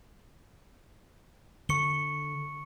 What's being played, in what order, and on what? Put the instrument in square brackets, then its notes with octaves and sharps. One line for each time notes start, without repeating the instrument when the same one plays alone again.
[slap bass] D3 [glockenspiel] C#6 C#7 G7